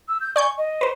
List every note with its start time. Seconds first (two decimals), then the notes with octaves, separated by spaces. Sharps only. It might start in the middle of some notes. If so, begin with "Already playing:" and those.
0.09 E6
0.21 G6
0.36 D5 G#5 C#6 G6
0.58 D#5
0.81 B4 C5